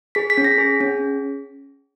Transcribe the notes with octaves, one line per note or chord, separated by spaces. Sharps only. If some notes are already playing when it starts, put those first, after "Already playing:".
G#4 B6
B6
C#4
A#6
G#4
C#4